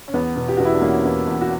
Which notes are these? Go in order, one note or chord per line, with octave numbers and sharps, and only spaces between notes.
C#4
E2 B3
B2
G4
E2 F#4
E4
D4
E2 A#3 C#4
E2
E2
F#4